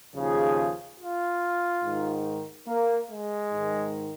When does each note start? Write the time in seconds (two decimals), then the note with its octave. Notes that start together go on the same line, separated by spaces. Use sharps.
0.14 D#2 C#3 F3 G#4
0.99 F4
1.83 G#2 D#3
2.68 A#3
3.10 G#3
3.52 G#2 D#3